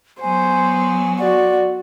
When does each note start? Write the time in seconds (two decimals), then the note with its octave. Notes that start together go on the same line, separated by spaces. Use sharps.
0.21 F#3 B3 C5 G#5
1.19 F#4 D5